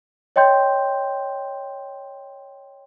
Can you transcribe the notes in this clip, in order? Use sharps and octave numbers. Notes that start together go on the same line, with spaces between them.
C#5 D#5 G5 C6 G6